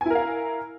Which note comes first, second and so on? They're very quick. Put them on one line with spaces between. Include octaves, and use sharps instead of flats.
G#5 E4 A#4 F5